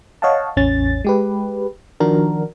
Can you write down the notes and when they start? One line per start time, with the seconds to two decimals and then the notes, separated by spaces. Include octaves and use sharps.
0.22 C#5 D#5 F5 F#5 A5
0.56 A1 E2 C#4 A6
1.05 G#3 G4 B4
2.00 D#3 F3 D4 F#4 A#4